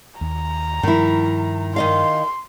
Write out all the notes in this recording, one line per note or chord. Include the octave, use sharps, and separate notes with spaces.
D#2 A#5
G2 D#3 F3 E4
D#3 D#5 F5 C6